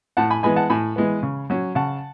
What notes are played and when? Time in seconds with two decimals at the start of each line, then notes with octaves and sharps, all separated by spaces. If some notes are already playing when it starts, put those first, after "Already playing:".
0.17 A2 F#5 A5
0.30 G#5 B5
0.43 E3 G#3 B3 G#5 B5
0.56 F#5 A5
0.70 A2 G#5 B5
0.96 E3 G#3 B3
1.23 C#3
1.50 F#3 C#4
1.75 C#3 F#5 A5